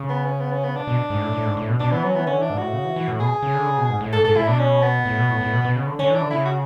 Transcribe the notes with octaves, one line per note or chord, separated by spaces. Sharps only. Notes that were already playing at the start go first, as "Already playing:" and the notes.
Already playing: C#3
B3
C#4
B3
C#4
B3
D4
B2
G#2
A2
A2
G#2
A2
B2
B2 D4
E3 B3
F#3 C#4
E3 B3
D3 C#4
E3 D4
G#2
A2 F#4
C#3
E3
E3
A2
B2 G#4
C#3
D3
C#3
B2
G#2
A2
G#2 A4
G#2 A4
A2 E4
B2 D4
C#4
B3
A2
B2
A2
A2
B2
B2
C#3
D3
D3 C#4
E3 D4
D3
C#3 E4
F#4